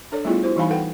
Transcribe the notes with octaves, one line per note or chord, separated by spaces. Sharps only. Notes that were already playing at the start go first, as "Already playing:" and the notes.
D4 A4 C#5 D5
G3 A3 B3 E4 F4 G#4
E4 F#4 C5
E3 G3 D#4 F5 G#5 B5
A4 B4 F#5 G5